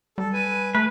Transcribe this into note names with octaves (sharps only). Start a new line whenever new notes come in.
G3 A4
B4 G#5
A3 B4